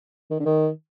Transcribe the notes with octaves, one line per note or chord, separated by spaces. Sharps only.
D#3
D3
D#3